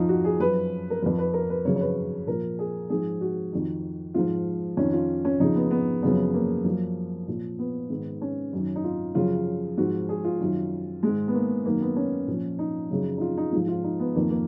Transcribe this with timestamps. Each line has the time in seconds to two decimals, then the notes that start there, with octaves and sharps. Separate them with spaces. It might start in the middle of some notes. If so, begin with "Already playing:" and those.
Already playing: F2 F3 D#4 F4
0.09 F#4
0.25 G#4
0.40 F#2 F3 B4
0.90 A#4
1.02 F2 F3 B4
1.18 B4
1.34 A#4
1.49 B4
1.65 F#2 C#3 F3 C#5
1.76 C#5
1.80 B4
2.27 A#2 F3 A#4
2.59 G#4
2.90 G#2 F3 G#4
3.21 F#4
3.52 F2 D#3
4.14 G#2 F3 F4
4.77 F2 D#3 C#4
4.93 F4
5.25 C#4
5.40 F2 C#3 F3 D#4
5.55 B3
5.71 B3
6.02 F#2 C#3 F3 B3
6.34 A#3
6.65 F#2 F3
7.28 A#2 F3
7.59 B3
7.90 G#2 D#3
8.22 C#4
8.53 F#2 D#3
8.76 D#4
8.84 F4
9.15 F#2 C#3 F3 F4
9.78 G#2 F3 F#4
10.09 G#4
10.24 F4
10.40 F#2 D#3
11.03 G#2 D#3 G#3
11.28 B3
11.34 A#3
11.65 F#2 D#3 A#3
11.81 B3
11.96 C#4
12.28 A#2 F3
12.59 D#4
12.90 F#2 C#3 F3
13.18 D#4
13.21 F4
13.37 D#4
13.52 G#2 F3 F4
13.68 F4
13.84 D#4
13.99 B3
14.15 F2 D#3 A#3
14.31 A#3